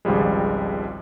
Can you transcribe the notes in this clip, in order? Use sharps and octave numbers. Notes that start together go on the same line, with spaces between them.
G#1 C#2 F3 G3 G#3